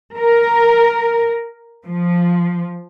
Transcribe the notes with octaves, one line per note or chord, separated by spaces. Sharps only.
A#4
F3